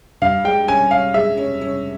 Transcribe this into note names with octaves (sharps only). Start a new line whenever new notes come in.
G2 F5
G#3 G5
C#4 G#5
C#4 F5
G#3 E5
C#4
C#4